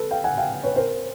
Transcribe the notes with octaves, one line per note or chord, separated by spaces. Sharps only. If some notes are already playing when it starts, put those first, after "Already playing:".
Already playing: A4 B4
F5 G5
F#5 G#5
F5 G5
B4 C#5
A#4 C5